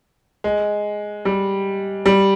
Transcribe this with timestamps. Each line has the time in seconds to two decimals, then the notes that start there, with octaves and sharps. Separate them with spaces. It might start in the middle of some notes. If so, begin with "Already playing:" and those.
0.44 G#3
1.25 G3
2.06 G3